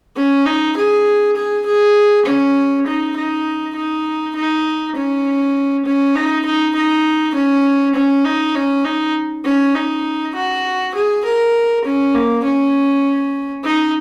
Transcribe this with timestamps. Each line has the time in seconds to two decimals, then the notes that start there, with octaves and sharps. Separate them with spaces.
0.16 C#4
0.46 D#4
0.77 G#4
1.36 G#4
1.66 G#4
2.26 C#4
2.86 D#4
3.16 D#4
3.76 D#4
4.36 D#4
4.96 C#4
5.85 C#4
6.16 D#4
6.45 D#4
6.75 D#4
7.35 C#4
7.95 C#4
8.25 D#4
8.55 C#4
8.85 D#4
9.45 C#4
9.75 D#4
10.35 F#4
10.95 G#4
11.25 A#4
11.84 C#4
12.15 A#3
12.44 C#4
13.64 D#4